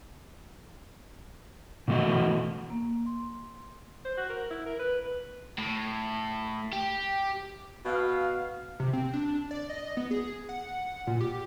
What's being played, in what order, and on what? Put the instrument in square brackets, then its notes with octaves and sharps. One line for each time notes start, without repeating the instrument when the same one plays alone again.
[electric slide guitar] B2 E3 A3 F#4 D#5
[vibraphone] A#3
C6
[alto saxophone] C5
F#4
A#4
E4
A#4
B4
[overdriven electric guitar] A2
G4
[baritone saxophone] B2 [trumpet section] F5
[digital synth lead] C3
C4
D4
D5
D#5
B3
G#4
F#5
A#2
G4